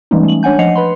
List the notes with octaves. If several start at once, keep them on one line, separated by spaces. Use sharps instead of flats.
E3 G3 G#3 A#3 C#4 D#4
A3 F#7
D4 C#5 F#5 G#5 G6
F3 D#5 F#5 C7 C#7 F7
B4 B5 C6